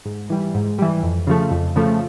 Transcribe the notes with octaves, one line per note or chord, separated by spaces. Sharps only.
G#2
E3 G3
G#2
E3 G3
F2
C#3 F3 A3
F2
C#3 F3 A3